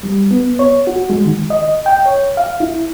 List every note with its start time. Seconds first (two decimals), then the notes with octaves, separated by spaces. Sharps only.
0.03 G3
0.31 B3
0.59 C#5
0.87 F#4
1.10 G#3
1.25 D#3
1.50 D#5
1.86 G5
2.05 C#5
2.37 F5
2.60 E4